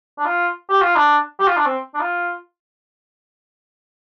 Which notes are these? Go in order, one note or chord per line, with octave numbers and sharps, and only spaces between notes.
D4
F4
G4
F4
D4
G4
F4
D4
C4
D4
F4